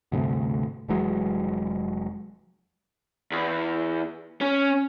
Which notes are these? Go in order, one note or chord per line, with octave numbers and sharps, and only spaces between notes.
D2 G2 C3 A3
F1 E3 F#3 G#3
E2
C#4